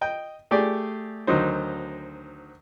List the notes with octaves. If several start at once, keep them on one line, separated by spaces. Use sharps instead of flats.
D#5 G5
A3 G4 G#4 D5
D2 D#3 F#3 D#4 C5